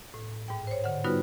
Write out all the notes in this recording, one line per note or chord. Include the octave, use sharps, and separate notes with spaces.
A2
G#2 G5
C5 C#5
D3 F#5
G3 B3 D#4 F4 F#4 B4